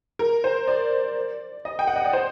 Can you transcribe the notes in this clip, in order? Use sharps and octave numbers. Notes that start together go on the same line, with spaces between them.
A#4
C5
D5
D#5
G5
F#5
D#5
D5
C5